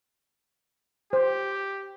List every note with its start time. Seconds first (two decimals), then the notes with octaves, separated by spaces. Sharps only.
1.13 G4 C5